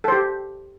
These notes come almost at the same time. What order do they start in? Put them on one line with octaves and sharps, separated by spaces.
A4 C5 G4